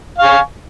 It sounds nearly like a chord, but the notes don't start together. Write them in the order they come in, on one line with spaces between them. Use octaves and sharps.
F5 C#6 G#5